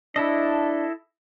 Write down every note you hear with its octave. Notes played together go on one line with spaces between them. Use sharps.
D4 E4 A4 D#5